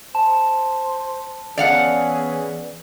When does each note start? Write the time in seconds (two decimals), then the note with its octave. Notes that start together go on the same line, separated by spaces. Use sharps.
0.15 C5 A5
1.57 E3 B3 C#4 G#4 D5 F5 F#5